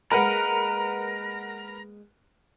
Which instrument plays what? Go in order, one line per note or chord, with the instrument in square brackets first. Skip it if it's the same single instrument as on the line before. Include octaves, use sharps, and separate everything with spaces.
[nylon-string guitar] G#3 A#3 B3 [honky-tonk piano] A#4 B4 F#5 [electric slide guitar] A#5